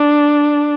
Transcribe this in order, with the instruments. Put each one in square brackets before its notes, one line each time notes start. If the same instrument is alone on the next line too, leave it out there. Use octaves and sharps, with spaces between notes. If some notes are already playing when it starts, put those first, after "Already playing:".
Already playing: [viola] D4